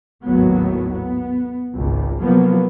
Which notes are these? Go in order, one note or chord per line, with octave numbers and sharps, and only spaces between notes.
G#1 D#2 A2 F#3 B3
B3
G#1 C#2
C3 F3 F#3 A#3 B3